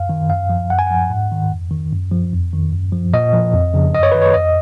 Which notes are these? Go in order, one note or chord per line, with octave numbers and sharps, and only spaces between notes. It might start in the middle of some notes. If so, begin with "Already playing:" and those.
Already playing: F#2 F5
D#3
F#2 F5
F3
F#2 F#5
G#5
F3 F#5
G#2
D#3
F2
D#3
F#2
F3
F2
D#3
F#2
F3
A#2 D#5
F3
F2
C#3 F3
F#2 D#5
C#5
D#3 B4
C#5
F2 D#5